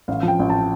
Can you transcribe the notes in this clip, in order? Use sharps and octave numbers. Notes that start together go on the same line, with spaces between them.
A1 F5
F3
G5
A1
A5